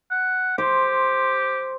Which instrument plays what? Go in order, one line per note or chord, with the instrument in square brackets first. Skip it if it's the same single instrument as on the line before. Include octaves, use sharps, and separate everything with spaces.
[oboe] F#5
[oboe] G4 [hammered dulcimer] C5 C6